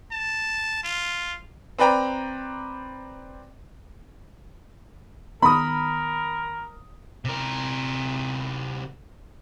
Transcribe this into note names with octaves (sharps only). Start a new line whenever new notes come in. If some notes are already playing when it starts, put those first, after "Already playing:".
A5
F4
C4 B4 D5 G5 A#5
D#3 B3 A#4 B5 D#6
C3 A#4